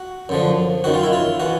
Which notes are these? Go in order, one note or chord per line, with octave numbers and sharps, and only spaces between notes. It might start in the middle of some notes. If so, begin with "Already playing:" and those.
Already playing: F#4
F#2 D3 F3
F#2 D#3 F#4
F4
E4
F4
E3 F#4